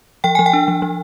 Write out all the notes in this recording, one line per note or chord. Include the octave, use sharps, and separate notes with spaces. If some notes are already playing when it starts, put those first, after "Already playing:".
F3 G5
F3 G#5
G5
D4
F3
F3